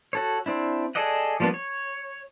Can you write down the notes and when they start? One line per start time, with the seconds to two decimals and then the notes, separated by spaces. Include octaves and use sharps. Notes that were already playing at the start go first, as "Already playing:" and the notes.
0.13 F#4 A4 C#5
0.46 C4 D4 E4
0.95 G#4 A4 D5 D#5 F#5
1.40 F3 G3 A#3 B3 D4
1.54 C#5